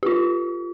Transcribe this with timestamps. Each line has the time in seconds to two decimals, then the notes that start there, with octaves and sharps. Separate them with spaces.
0.03 G4
0.06 F4